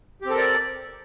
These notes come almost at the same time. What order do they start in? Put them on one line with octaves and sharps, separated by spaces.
G4 C4 A4 A#4 D5